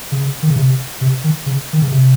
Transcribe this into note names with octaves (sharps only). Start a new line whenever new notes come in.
C#3
D#3
C#3
C3
C3
D#3
C#3
D#3
C#3
C3